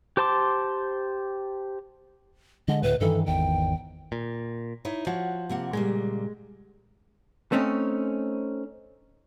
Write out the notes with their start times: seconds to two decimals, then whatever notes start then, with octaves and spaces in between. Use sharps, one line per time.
0.17 G4 C5 A5 C6 D6
2.68 D3 G#3 D#5
2.83 D2 A2 B4
3.01 G2 D#3 E3 A4
3.26 G#1 E2 D#3 G5
4.12 A#2
4.85 D#4 E4 C#5
5.07 F3 F#4 C#5 F#5
5.50 C3 A#3 F#5
5.73 A#2 C#3 G3 G#3
7.52 A3 C4 C#4 D#4